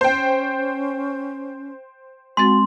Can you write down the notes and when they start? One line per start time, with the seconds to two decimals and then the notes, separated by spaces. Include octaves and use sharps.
0.01 C#4 C5 G5
2.37 G#3 C4 F#4 C6 A6